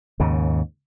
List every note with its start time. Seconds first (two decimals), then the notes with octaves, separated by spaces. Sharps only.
0.20 D#2 G#2 C#3